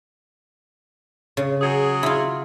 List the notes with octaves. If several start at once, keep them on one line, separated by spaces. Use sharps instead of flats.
C#3
F#3 G#4
E4 F4